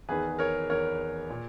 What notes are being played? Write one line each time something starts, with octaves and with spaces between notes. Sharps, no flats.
E2 D#3 G#4 B4
A#4 C#5
E2 D#3 A#4 C#5
A#2